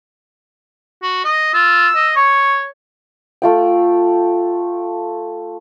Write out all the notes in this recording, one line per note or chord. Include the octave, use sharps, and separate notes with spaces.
F#4
D#5
F4 E6
D#5
C#5 C#6
A3 F4 G5